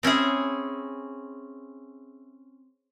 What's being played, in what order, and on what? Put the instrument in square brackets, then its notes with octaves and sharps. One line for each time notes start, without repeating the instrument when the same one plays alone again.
[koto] C4 C#4 E4 G#4